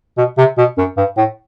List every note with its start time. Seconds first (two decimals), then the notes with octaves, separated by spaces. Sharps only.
0.18 B2
0.38 C3
0.58 B2
0.78 F#2
0.98 G2
1.17 A2